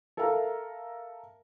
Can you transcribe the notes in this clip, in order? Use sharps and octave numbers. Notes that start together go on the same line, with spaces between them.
A4 A#4 E5 F5 A#5